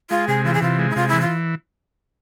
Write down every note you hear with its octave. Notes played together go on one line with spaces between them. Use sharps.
G#3 F4
C3 G#4
E3 F4
G#4
C3 F4
G#3
E4
C3 F4
E3 E4
F4